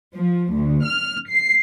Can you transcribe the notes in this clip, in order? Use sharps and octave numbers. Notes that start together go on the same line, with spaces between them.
F3
D2
F6
C7